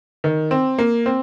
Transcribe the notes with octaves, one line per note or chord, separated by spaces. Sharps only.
D#3
C4
A#3
C4